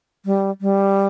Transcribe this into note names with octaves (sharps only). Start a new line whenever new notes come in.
G3
G3